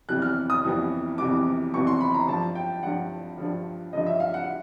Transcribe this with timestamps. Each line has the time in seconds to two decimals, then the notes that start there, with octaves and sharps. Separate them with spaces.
0.09 F2 C3 E3 G3 B3 F#6
0.22 F6
0.50 D#6
0.64 F2 C3 E3 G3 B3
1.18 F2 C3 E3 G3 B3 D6
1.73 F2 C3 E3 G3 B3 C#6
1.87 C6
2.01 B5
2.14 A#5
2.28 G2 D3 F3 A5
2.55 G5
2.83 G2 D3 F3 F#5
3.38 G2 D3 F3
3.93 G2 D3 F3 D#5
4.06 E5
4.20 F5
4.34 F#5